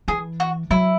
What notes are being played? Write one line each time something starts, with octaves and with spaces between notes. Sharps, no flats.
E3 G#4
F#4
F#3 E4